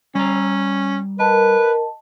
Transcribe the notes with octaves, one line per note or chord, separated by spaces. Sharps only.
G3 C#4 A#5
A#4 B4 D#5 A5